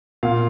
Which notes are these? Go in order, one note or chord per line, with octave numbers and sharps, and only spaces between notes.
A#2 F5